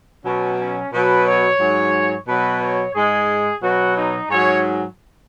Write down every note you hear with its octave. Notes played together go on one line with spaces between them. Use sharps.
B2 F#3 C#4
C#4
B2 F#3 B4
C#5
G#2 F#3
B2 F#3 B4
C#5
G#2 G#3 G#4
B2 F#3 F#4
D#4
G#2 F#3 C#5